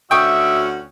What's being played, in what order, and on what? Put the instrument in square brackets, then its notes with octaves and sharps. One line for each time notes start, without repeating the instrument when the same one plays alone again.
[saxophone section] D2 C#4 F#4 [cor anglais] E5 [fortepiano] G5 C#6 D#6